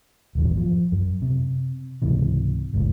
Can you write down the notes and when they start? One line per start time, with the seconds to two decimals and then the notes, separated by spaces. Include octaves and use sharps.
0.35 D#1 G#1 E2 F#3
0.57 F3
0.92 F#2
1.22 C3
2.02 C#2 G#2 C3 E3
2.74 G1 C#2 A2